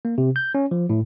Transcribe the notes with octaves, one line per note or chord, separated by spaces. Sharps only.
A#3
C3
G6
C#4
F3
A2